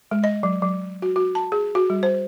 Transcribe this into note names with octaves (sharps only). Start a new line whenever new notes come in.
G#3
D#5
F#3
F#3
F#4
F#4
A5
G#4
F#4
G3
C5